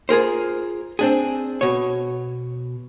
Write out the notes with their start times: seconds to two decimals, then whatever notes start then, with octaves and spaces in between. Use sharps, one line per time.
0.09 F4 G#4 A#4 C5
0.99 C4 D4 G#4
1.61 B2 C#5